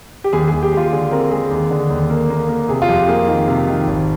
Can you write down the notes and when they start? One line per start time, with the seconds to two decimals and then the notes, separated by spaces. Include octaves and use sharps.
0.24 G4
0.33 D#2 G#4
0.48 G#4
0.53 D#2
0.63 G4
0.72 G#3 F4
0.92 D3 G#4
1.11 C4 A#4
1.31 G#3 G#4
1.51 D#2
1.71 D3
1.90 D#2
2.10 A#3
2.30 A#3
2.49 A#3
2.69 C3 G#4
2.82 F4
2.89 F2 G4
3.08 A#3 G#4
3.28 D#3
3.48 C3
3.67 D#3
3.87 G#1